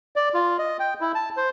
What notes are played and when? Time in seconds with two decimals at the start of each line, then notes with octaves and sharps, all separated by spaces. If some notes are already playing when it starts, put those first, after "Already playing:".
0.16 D5
0.34 F4
0.58 D#5
0.79 G5
1.01 E4
1.15 A5
1.37 C5